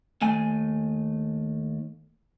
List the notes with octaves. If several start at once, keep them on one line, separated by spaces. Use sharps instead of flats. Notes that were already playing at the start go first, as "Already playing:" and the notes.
D#2 A3 G#5